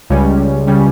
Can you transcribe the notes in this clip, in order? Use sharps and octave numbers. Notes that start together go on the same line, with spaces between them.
C#2 C#3 G3 C#4
C#3 G3 C#4